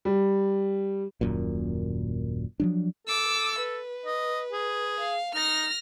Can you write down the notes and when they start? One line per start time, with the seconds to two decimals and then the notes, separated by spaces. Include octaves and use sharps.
0.05 G3
1.21 D#1 F#2 A#2
2.60 F3 F#3 D4
3.07 A4 D6 E6
3.59 B4
4.06 D#5
4.52 G#4
5.00 F5
5.35 D#4 F6 A#6